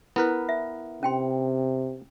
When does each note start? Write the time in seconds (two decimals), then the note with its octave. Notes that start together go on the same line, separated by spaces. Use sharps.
0.16 B3 E4 A#4 B4
0.49 E5
1.03 C3 C#4 G5 C6